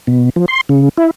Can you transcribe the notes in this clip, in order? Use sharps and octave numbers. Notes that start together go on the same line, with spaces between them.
B2
F3
C6
C#3
E4